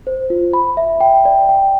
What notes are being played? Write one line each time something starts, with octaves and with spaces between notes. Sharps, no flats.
C5
F4
B5
E5
G5
D5
G5